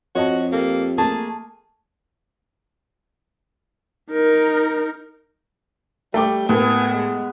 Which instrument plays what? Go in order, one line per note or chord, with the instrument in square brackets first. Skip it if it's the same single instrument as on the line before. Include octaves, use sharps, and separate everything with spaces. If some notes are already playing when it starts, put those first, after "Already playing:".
[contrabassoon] F2 [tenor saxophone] F#4 [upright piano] C#5 D#5 A5
[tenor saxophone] A#3 [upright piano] G4 A4
[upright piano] A3 A#3 [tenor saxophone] G#4 [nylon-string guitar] A5
[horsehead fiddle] D#4 A#4
[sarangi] G3 [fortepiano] A3 G5 D6
[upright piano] A2 A#3 [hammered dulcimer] B3 [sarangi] G#5
[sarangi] G#3